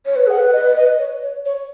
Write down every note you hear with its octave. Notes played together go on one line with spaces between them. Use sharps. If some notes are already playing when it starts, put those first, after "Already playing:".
C#5
B4
G#4 F#5
B4
D#5
D#5
C#5
C#5
C#5